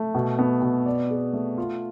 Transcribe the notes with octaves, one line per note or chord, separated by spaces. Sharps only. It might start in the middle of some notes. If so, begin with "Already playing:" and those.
Already playing: A3
B2
B3
B2
D5
G#4
A3
F4